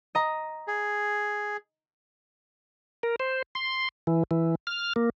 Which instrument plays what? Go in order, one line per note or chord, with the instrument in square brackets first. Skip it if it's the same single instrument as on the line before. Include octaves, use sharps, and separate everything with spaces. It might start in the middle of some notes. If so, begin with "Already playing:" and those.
[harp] D#5 A#5
[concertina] G#4
[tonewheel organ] A#4
C5
C6
E3
E3
F6
A#3